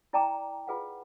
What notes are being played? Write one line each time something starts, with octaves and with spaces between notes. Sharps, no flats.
E4 D5 G5 A5 A#5 D6
F4 G#4 B4 F5 F#5